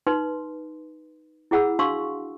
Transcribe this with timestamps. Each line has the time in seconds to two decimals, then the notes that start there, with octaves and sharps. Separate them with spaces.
0.07 D#4 B4 C6
1.51 E4 G#4 F#5 B5 E6
1.79 D4 F#4 F5 C6 C#6 E6